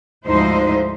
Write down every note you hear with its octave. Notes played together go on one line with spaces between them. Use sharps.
D2 G#2 F3 D#4 E4 C5